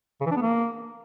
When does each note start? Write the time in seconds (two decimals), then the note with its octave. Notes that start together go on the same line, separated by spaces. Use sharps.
0.21 C#3
0.26 E3
0.31 D4
0.36 B3
0.42 A#3